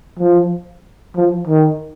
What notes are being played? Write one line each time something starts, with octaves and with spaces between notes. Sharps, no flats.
F3
F3
D#3